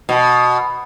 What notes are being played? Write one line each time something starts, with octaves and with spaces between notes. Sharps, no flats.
B2